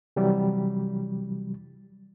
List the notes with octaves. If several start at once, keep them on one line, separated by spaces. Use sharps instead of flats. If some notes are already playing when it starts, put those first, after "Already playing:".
C3 E3 F#3 G3